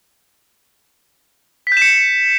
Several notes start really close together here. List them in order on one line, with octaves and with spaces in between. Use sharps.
B6 G6 E7 C#7